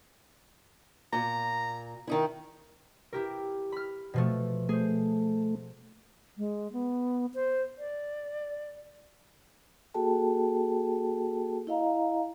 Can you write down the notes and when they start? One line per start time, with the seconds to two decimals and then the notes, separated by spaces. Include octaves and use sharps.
1.13 A#2 A#5
2.07 D#3 D#4 E4
3.13 E4 G4 A#4
3.72 B5 F6
4.14 B2 F3 A3
4.69 A3 G#4 C5
6.38 G#3
6.73 B3
7.34 C5
7.79 D5
9.94 A#3 F#4 G#4 A4 G5 A5
11.67 E4 D#5 F5 A#5